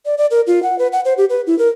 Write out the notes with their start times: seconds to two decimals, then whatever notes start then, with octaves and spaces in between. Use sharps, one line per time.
0.06 D5
0.18 D5
0.31 A#4
0.47 F4
0.63 F#5
0.79 B4
0.92 F#5
1.05 C5
1.18 G4
1.30 B4
1.47 E4
1.59 A#4